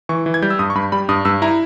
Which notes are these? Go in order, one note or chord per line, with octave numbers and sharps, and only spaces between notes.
E3 C#6
E3
G#6
G3 G6
E6
G2 D#6
C#6
G2 B5
G3 B5
G2 D#6
G2 E6
E4 A#5